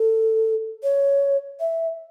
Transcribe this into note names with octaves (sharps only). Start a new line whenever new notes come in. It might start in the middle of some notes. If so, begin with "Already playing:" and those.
Already playing: A4
C#5
E5